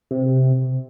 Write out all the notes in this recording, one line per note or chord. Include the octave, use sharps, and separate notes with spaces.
C3